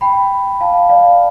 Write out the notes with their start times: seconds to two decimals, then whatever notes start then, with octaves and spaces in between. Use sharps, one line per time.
0.01 G5 B5
0.61 F5 A5
0.89 D5 F5